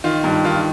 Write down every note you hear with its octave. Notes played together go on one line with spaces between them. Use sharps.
D#3 F4
G2
D#3 F4